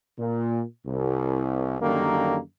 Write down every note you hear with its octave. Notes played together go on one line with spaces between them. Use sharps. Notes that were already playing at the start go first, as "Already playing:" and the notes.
A#2
C2
F#2 D3 D#3 G3 A#3